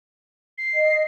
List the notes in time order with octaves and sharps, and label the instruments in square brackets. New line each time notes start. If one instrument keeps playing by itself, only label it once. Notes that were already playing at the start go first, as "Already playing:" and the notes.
[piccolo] C7
[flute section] D#5